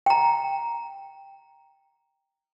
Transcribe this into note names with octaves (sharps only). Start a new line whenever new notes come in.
G5 A#5